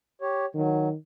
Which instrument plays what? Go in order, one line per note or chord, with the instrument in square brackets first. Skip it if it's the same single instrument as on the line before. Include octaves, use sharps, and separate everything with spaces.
[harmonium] G4 C#5
[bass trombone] D#3 [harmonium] F#3